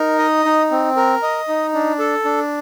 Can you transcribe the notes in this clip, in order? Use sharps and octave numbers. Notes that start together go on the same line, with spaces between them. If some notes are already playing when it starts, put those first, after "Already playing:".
Already playing: D#4 A#4
D#5
D#4
C4
A#4
D#5
D#4
D4
A4
D4